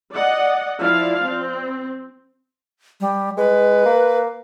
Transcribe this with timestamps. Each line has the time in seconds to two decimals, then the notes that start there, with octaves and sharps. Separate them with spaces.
0.14 D5 D#5 F#5
0.81 F3 E4 D5 F5
1.26 C4
3.00 G3
3.37 G#3 B4
3.86 A#3